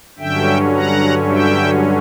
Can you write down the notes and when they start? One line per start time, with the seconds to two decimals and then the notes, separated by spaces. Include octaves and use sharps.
0.19 G2 D3 F#3 C#4 E5 G5
0.75 F#5 A#5
1.30 E5 G5